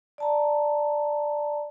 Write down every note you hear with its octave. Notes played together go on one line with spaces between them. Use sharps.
D5 A5 A#5